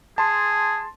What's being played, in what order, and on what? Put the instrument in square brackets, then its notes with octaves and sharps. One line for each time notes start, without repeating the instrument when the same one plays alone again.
[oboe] G#4 [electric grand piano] A5 C6